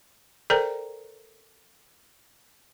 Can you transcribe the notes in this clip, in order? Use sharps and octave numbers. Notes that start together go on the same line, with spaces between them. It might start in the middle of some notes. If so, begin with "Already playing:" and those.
A4 A#4 C5 D5 G5 A#5